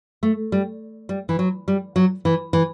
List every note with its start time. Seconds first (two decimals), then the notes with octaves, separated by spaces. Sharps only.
0.23 A3
0.52 G3
1.09 G3
1.29 E3
1.39 F#3
1.68 G3
1.96 F#3
2.25 E3
2.53 E3